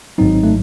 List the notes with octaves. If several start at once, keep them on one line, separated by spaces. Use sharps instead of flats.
G#1 G#2 F#3 C4 D#4
A3